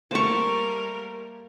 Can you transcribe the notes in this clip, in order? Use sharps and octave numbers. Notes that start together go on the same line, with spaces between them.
G3 A3 A#3 A#4 C5 A5 C#6